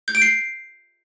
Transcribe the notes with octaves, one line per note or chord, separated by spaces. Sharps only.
G6
D7
C7